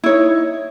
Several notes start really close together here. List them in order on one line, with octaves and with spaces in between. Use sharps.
E4 C#5 D#4